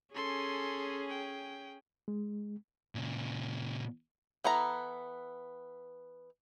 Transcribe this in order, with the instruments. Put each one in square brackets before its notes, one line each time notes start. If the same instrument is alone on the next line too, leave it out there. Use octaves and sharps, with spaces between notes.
[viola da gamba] C#4 G#4 [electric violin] A4 C6
[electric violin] G5
[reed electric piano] G#3
[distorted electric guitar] A#2 C#3
[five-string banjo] E3 B3 A4 A#5